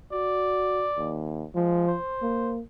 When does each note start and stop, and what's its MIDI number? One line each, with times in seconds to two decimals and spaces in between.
0.12 0.87 66
0.12 1.21 74
0.98 1.46 39
1.55 1.96 53
1.55 1.84 56
1.87 2.55 72
2.22 2.61 58